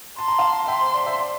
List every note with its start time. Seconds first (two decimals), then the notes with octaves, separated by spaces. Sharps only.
0.18 A5 C6
0.28 A#5
0.39 F5 A5
0.68 E5 G5 C6
0.81 C5
0.94 D5
1.06 C5 E5
1.19 D5